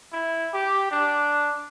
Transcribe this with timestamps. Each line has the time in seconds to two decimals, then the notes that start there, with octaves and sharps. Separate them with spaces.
0.12 E4
0.53 G4
0.92 D4